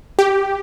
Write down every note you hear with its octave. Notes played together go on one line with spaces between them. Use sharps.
G4